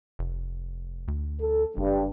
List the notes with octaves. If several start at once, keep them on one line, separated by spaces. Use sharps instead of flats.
F1
D2
A4
F#1 G2